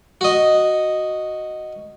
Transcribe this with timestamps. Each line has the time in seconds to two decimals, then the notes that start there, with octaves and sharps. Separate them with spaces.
0.21 F#4 D#5